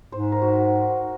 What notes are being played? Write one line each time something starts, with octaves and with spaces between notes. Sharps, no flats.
G#2 C5
A#4
F#4